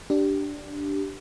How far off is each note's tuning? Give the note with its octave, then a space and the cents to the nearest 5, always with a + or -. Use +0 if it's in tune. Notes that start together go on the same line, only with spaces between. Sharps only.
D4 -5 G4 -15